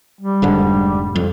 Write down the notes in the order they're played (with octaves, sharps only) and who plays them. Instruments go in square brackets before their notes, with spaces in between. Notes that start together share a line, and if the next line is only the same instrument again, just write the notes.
[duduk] G3
[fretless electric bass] F1 G#2 D3
F2